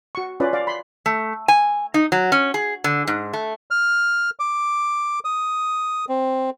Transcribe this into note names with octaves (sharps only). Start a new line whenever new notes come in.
F#4 C#6
C#4 F4 B4 D5
D5 F5
B5 C6
A3
G#5
D#4
F#3
C#4
G#4
D3
G#2
A3
F6
D6
D#6
C4